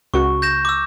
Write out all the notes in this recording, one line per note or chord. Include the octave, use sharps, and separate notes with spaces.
C#2 F#4 C#6
G6 A#6 E7
D6 E6